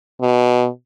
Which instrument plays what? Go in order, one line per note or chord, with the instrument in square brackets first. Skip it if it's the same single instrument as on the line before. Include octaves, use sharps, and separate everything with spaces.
[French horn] B2